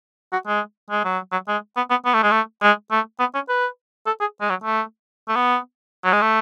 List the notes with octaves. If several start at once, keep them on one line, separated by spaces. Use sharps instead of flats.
F#4
G#3
G#3
F#3
F#3
G#3
B3
B3
B3
A3
G#3
A3
G#3
A3
B3
C#4
B4
A4
G#4
G#3
F#3
A3
A3
B3
F#3
G#3
A3